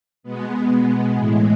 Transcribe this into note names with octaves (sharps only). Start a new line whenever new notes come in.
B2 G#3 B3
A2 E3 G#3